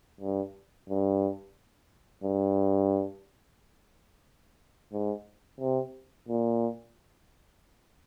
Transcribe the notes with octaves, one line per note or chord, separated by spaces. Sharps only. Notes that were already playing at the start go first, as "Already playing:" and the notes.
G2
G2
G2
G#2
C3
A#2